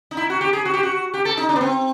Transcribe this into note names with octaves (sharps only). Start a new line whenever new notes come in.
D#4
E4
F#4
G4
G#4
F#4
G4
F#4
G4
A4
D#4
D4
B3
C4